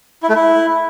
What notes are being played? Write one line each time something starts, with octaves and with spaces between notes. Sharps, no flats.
E4
A3
E4